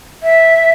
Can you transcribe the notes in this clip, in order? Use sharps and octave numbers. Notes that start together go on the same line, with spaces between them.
E5